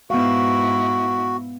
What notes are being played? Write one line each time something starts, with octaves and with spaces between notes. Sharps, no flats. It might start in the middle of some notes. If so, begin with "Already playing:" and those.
G#2 B3 E4 F#4 F5